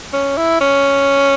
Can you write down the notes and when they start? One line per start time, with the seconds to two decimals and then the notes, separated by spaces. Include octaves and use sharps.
0.13 C#4
0.37 E4
0.61 C#4